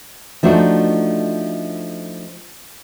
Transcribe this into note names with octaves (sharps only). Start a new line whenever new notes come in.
F3 A3 D4 D#4 F#4